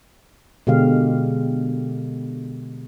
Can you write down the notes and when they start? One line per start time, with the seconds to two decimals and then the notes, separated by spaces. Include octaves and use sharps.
0.67 B2 D3 G#3 G4 F5